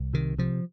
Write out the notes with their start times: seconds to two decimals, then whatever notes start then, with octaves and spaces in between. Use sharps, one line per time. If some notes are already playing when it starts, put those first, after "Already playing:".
Already playing: C2
0.14 C3 D#3
0.38 C3 F3